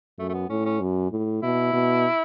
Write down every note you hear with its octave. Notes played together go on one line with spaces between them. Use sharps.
F#2 A3
A3
B3
A2 C#4
C#4
F#2
A2
B2 E4
B2